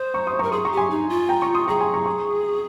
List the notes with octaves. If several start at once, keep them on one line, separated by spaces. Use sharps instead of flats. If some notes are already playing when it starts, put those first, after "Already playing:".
Already playing: C5 C6 D#6
A#5 C#6
C6 D#6
A#4 A#5 C#6
G#4 C6 D#6
A#5 C#6
G4
G#5 C6
D#4
F4
G5 A#5
A#5 C#6
C6 D#6
G#4 A#5 C#6
G#5 C6
A#5 C#6
A#5 C#6